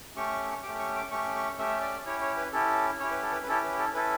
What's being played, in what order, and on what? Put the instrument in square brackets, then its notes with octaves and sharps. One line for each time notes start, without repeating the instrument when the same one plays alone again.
[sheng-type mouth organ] A3 C#4 G4 C#6
A3 C#4 G4 D6
C#6
D6
A3 C#4 G4 C#6
C#6
A3 C#4 G4 E5
D5
C#4 E4 G4 C#5
C#5
B4
C#4 E4 G4 A4
C#4 E4 G4 C#5
B4
A4
B4
B4
C#4 E4 G4 A4
B4
A4
C#4 E4 A4 B4